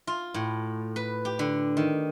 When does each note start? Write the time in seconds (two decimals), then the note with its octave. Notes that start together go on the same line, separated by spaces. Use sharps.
0.07 F4
0.34 A2
0.96 B4
1.25 G4
1.39 D3
1.77 D#3